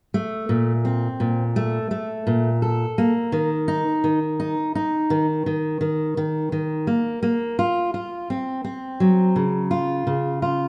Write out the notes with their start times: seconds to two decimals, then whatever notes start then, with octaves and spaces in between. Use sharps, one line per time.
0.14 A3
0.49 A#2
0.85 C4
1.20 A#2
1.56 A3
1.91 A3
2.27 A#2
2.62 A4
2.98 A#3
3.32 D#3
3.68 D#4
4.04 D#3
4.40 D#4
4.75 D#4
5.10 D#3
5.46 D#3
5.81 D#3
6.17 D#3
6.52 D#3
6.87 A#3
7.23 A#3
7.59 F4
7.94 F4
8.30 C4
8.64 C4
9.00 F#3
9.36 C#3
9.71 F4
10.07 C#3
10.42 F4